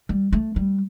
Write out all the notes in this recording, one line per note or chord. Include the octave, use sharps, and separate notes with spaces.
G3
A3
G3